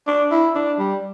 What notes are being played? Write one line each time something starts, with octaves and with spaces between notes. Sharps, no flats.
D4
E4
D4
G3